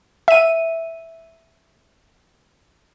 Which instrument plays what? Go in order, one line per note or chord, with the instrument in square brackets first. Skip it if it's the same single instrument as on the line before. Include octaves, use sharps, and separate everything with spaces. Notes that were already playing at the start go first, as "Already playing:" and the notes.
[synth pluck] E5 D#7